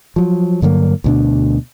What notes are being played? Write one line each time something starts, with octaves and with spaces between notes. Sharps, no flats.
F3 F#3
G2 D3 F#3 A#3
D2 B2 D4